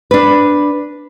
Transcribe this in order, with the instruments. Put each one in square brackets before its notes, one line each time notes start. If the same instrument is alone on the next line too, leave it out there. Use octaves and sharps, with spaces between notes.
[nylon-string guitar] D4 B4